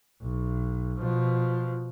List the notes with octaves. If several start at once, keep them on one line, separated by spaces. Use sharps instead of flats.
B1
B2 F3